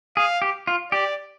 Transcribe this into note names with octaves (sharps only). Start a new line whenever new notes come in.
G#4 F5
G4
F4
G4 D5